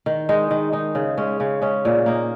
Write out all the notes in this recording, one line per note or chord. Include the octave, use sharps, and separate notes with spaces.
D#3
G#3 D#4
D#3
G#3 D#4
C#3
G#3 C#4
C#3
G#3 C#4
A#2
A#3 D#4